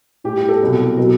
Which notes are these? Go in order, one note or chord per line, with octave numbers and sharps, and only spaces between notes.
A2 G3 G4
G4
A4
C2 B2 F#3
B2 F#3